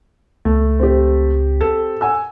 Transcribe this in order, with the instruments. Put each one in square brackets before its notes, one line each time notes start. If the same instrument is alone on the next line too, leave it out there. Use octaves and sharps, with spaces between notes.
[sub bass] C#2 [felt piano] A3
[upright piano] C4 G4
[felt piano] A4
[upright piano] F#5 G#5 E6